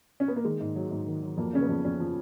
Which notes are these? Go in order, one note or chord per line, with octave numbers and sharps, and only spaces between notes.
C#4
B3
A#3
D#3 G#3
G#2
F#3
G#2
D#3
F#3
F2 A#3
C#3 C#4
B3
F2
F2 C#4
F3